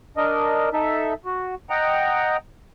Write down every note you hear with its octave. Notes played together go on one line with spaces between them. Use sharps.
D4 A#4 D#5
D#4 A4 E5
F#4
D#5 F#5 G5 A#5